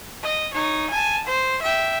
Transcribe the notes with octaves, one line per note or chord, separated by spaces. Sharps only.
D#5
D#4 C#5
G#5 A5
C5
E5 G5